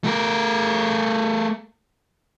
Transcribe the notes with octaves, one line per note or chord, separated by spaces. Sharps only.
A3 A#4